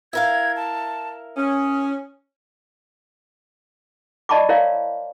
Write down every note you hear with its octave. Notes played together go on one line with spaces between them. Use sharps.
E4 A#4 F5 G#6
A5
C#4 D#6
D5 D#5 A5 B5 C#6 D6
E4 A#4 C#5 D5 F5